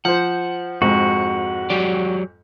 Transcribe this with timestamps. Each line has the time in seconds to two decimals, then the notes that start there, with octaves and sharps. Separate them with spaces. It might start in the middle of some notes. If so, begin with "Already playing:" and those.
0.05 F3 C5 F#5
0.82 F2 G#2 F#4
1.70 F#3 G4 D5